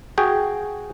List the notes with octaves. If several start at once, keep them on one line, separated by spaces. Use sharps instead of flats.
F#4 G#4 G5